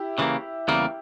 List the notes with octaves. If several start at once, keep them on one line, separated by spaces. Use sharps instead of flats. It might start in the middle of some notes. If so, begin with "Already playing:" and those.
Already playing: E4 G4
C#3 E3 G3 A#3
E2 C#3 G3 A#3